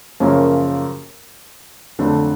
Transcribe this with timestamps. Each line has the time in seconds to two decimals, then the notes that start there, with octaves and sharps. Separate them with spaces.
0.20 F#2 C#3 F3 A#3 C#4
1.99 F2 D3 F#3 A3 D4